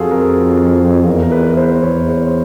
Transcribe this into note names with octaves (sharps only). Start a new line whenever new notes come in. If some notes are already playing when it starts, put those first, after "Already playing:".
Already playing: F2 F4 F#4 G#4 A4
A#4
E2 A#4
A#4
B4
B4
C5
E2 C#5
C5